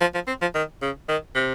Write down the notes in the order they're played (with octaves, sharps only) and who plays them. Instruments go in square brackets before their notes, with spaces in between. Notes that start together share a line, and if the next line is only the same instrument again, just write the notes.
[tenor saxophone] F3
F3
C4
F3
D#3
C#3
D#3
C3